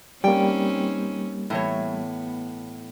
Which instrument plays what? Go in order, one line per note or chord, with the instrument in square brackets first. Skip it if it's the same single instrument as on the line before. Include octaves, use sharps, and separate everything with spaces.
[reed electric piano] G3 A#3 [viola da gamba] C4 C#4 D#4 [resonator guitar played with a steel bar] G5
[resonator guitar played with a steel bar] A2 E3 C#5 [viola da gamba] B3